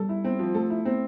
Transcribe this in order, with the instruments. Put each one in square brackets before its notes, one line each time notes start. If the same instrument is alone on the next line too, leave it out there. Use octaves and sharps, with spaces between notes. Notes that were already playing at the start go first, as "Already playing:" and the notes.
Already playing: [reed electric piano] G3 [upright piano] A4
[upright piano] E4
C4
F3
[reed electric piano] A3 [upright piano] A4
[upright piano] E4
C4